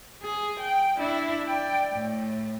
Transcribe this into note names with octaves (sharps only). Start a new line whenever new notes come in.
G#4
G5
D4 E4
D5 G5
A2